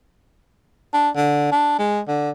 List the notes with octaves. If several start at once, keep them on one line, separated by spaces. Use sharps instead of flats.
D4
D3
D4
G#3
D3